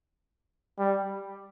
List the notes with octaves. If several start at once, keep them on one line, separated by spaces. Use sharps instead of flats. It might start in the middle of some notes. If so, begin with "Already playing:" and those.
G3